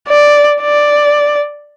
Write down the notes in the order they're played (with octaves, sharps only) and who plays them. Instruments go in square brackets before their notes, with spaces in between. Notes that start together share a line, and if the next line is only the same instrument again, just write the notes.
[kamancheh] D5
D5